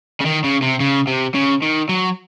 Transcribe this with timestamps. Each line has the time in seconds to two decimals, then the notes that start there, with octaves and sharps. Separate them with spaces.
0.20 C#3
0.26 D#3
0.44 C#3
0.62 C3
0.80 C#3
1.07 C3
1.35 C#3
1.62 D#3
1.89 F#3